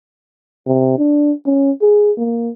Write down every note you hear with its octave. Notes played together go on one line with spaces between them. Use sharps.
C3
D4
C#4
G#4
A#3